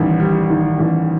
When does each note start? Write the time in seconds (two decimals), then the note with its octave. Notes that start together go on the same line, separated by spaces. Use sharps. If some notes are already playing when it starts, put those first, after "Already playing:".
Already playing: A1 D#3 G3
0.20 G3
0.50 D#3
0.80 A1